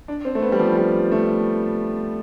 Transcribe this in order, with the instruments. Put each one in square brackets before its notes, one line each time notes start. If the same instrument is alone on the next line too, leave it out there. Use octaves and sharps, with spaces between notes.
[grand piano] D4
C4
A3
B3
G3
F3
G3
A3